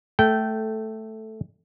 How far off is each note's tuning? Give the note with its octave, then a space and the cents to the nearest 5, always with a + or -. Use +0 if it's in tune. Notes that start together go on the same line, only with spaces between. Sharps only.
A3 +0 G5 -20